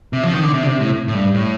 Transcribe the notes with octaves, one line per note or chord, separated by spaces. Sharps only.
C3
F3
D#3
D3
C3
D3
C3
A2
A2
G2
A2